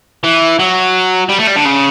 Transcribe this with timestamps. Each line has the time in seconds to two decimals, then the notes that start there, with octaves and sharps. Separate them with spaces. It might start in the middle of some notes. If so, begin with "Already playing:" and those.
0.24 E3
0.59 F#3
1.29 G3
1.39 A3
1.47 G3
1.56 D3
1.65 C#3